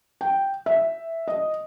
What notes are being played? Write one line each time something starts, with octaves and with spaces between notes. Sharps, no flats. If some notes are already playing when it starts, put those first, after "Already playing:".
G5
E5
D#5